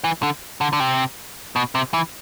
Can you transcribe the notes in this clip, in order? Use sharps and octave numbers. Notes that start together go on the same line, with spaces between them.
E3
D3
D3
D3
C3
B2
C3
E3